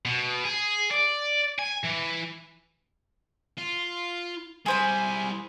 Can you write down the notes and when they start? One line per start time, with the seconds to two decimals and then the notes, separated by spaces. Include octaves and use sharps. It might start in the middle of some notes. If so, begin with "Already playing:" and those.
0.06 B2
0.44 G#4
0.91 D5
1.59 G#5
1.85 E3
3.58 F4
4.66 G3 E4 G#4 C5 G#5 B5